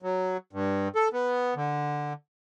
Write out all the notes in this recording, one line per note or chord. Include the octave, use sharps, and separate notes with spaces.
F#3
G2
A4
B3
D3